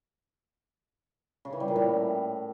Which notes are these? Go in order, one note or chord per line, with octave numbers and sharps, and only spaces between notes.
C#3
E3
G3
A#2
A2